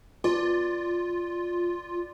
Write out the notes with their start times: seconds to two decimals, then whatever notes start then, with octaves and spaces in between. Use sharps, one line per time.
0.24 F4 D5